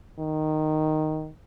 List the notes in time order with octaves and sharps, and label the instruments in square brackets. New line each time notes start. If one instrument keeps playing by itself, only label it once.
[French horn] D#3